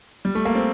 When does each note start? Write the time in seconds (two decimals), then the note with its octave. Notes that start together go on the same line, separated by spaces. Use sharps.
0.25 G3
0.35 A3
0.45 A#3
0.55 C4